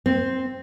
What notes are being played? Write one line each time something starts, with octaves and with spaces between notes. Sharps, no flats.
C4